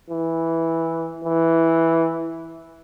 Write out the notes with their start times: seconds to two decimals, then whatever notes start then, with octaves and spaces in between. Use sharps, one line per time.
0.10 E3
1.24 E3